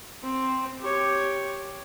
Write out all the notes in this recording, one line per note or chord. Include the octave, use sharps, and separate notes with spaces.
C4
G4 C#5